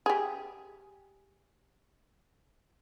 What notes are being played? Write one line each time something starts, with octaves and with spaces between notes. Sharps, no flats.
G4 G#4